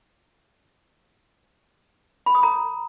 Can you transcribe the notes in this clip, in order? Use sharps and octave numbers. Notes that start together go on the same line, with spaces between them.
B5
D#6
A#5